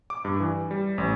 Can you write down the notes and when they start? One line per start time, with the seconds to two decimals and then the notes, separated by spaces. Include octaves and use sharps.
0.10 D6
0.25 G2
0.40 E3
0.71 G3
0.98 A1